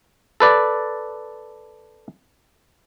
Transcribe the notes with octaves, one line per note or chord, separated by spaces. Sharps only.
A4 B4 D5